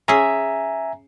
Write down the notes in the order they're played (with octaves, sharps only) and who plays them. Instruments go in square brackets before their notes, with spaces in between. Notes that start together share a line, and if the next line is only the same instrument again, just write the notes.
[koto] C#4 G#4 [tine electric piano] E5 G#5 A#5